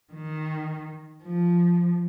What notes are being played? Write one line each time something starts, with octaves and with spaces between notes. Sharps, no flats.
D#3
F3